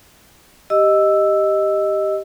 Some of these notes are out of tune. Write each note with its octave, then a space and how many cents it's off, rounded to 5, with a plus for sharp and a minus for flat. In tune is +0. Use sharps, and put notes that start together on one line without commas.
G4 +0 D#5 +0 E6 +0